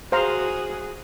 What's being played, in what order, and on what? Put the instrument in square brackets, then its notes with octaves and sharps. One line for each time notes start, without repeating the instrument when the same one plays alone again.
[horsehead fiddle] F#4 G#4 [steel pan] C5 F5 A#5